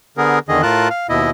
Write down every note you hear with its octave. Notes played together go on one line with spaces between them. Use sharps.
D3 B3 G#4 A#4
E2 D3 D#3 G#4 D#5
A2 F4 A#4 A5 F#6
F5
D#2 B2 E4 D#5